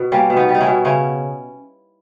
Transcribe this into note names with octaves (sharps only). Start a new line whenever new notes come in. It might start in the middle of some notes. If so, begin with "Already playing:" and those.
Already playing: B2
G3 A#3 C#4
B2
B3 D#4
G3
D#4
C#4 E4
B2
C#3 C#4 E4